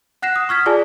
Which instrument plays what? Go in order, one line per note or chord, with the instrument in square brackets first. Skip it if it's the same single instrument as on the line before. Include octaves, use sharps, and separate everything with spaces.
[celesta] F#5 F#6 A#6 C7 E7
D#6
C#6 F6 G#6 B6
F4 G#4 D5 G#5 A5